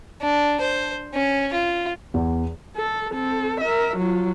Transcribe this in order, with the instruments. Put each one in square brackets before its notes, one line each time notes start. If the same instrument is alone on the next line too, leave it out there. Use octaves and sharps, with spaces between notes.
[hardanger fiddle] D4
C5
C#4
F4
[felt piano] E2
[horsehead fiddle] A4
C4 A4
A#4 E5
F#3 F4